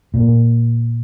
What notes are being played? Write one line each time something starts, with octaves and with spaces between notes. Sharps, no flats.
A#2